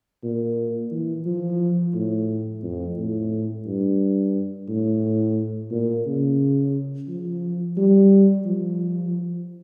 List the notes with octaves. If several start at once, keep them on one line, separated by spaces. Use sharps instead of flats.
A#2
E3
F3
A2
F2
A2
G2
A2
A#2
C#3
F3
G3
F3